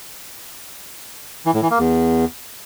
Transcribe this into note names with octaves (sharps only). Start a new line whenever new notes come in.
E3
A2
E3
A#3
E2